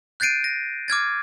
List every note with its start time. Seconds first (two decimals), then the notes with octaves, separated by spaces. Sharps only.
0.20 F#6 G6 A6 C7 D7 D#7
0.44 A#6
0.88 D6 F6 G#6 A6